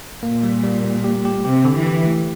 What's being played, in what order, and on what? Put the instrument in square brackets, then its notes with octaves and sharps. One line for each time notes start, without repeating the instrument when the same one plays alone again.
[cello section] A#2 [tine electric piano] A#3
[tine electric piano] G3
G3
G3
G4
G4
[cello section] C3 [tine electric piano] G4
[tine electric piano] D3
[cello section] E3
[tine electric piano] G4
A3